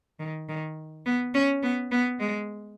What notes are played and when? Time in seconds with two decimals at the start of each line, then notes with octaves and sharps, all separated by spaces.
0.20 D#3
0.49 D#3
1.06 B3
1.34 C#4
1.63 B3
1.92 B3
2.19 G#3